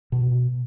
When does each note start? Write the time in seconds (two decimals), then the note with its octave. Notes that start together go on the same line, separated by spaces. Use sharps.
0.12 B2